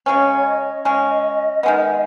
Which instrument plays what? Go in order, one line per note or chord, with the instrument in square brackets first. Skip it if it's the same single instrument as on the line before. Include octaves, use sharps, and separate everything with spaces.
[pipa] C#3 G#3 C#4 [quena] C#5
[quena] D#5
[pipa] C#3 G#3 C#4
D#3 G#3 B3